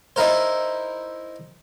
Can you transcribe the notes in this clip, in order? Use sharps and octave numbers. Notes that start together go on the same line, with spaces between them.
D#4 E4 A#4 C5